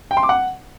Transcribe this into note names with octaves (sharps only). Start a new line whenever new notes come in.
G5
C6
D6
F#5